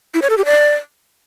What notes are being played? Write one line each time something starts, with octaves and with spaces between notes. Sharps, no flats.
E4
C#5
A4
G4
D5